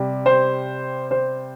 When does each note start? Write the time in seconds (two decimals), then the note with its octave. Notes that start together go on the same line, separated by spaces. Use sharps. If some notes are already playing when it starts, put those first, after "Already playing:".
Already playing: C3 G3
0.26 C5
1.11 C5